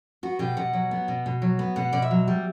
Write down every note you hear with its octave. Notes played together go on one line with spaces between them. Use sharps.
B3 F#4
B2 G4
B2 F#5
F#3
B3
B2
B2
F#3
B3
B2 F#5
B2 D5
E5
F#3
G3